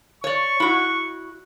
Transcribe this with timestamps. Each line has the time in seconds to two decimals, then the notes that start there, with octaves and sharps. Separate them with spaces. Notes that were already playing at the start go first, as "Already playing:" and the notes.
0.24 C#5 D5 C#6
0.60 E4 F#4